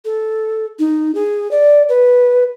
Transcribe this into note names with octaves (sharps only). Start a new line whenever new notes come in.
A4
D#4
G#4
D5
B4